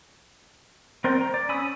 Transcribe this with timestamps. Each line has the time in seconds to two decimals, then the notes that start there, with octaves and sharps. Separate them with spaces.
1.04 C4 A#4 C5 D5 G5
1.21 A#5
1.34 D5
1.49 C#4 G#5 B5 D#6 E6